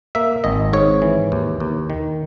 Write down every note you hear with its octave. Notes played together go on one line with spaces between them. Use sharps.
A#3 E5
G#1 D#5
G#2 C#5
E3
D#2
D#2
D#3